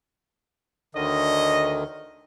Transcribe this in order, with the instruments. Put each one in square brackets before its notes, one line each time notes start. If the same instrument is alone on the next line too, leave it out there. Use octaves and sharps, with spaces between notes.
[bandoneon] D2 D3 D#3 [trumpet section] D4 C#5 D#5